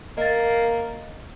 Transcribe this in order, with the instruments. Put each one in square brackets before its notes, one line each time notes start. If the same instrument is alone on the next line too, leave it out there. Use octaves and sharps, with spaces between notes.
[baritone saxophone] A#3 [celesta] D#5 A6